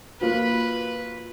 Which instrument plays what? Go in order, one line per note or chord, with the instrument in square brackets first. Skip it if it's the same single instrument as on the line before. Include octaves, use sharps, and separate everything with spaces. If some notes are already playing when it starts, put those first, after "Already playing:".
[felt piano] A#3 F4 F#4 [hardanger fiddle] B4